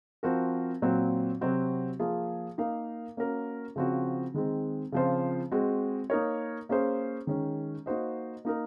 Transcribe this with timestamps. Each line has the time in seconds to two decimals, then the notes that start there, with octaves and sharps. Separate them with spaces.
0.23 F3 C4 F#4 A#4
0.82 A#2 F#3 C4
1.41 C3 F#3 C4 F#4
1.99 F3 A#3 F4 G#4
2.58 A#3 D#4 A#4 F5
3.17 A#3 C#4 F#4 A#4
3.76 C#3 F3 C4 F#4
4.34 D#3 G#3 C4
4.92 C#3 F3 C4 F4 C5
5.51 G#3 C4 F#4
6.10 A#3 D#4 A#4 C#5
6.69 A#3 C#4 G#4 C5
7.27 D#3 G#3 C#4
7.86 A#3 D#4 F#4 C5 D#5
8.45 A#3 D#4 A#4